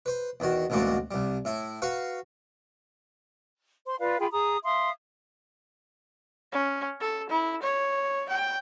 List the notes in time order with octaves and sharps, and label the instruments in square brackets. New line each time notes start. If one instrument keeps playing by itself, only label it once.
[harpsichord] B4 C5
E2 D#3 F#4
A1 D2 A#2 G#3 F#4 D5
C2 G3
A2 E4
F#4 B4 F5 C#6
[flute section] C5 C6
F4 B4 D5 F5
F4 G#4 G5 B5
G#4 A#5 D#6
E5 F5 C6 D#6
[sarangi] C#4
A4
E4
C#5
G5